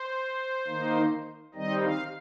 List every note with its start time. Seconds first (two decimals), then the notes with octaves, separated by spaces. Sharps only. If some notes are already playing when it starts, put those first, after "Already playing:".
Already playing: C5
0.68 D#3 A#3 D#4
1.54 D#3 G3 C4 D#4 D#5
1.83 F5